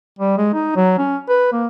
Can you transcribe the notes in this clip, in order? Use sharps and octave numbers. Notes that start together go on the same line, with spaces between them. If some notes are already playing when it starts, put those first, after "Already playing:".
G3
G#3
D#4
F#3
C#4
B4
A#3